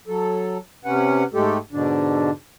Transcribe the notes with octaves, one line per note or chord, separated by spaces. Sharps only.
F#3 A4
C3 C#4 B4 F#5
G#2 G#3 A3 G4 A4
G#2 B2 D3 D4